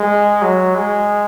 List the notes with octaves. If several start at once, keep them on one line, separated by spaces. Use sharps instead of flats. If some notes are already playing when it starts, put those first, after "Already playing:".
Already playing: G#3
F#3
G#3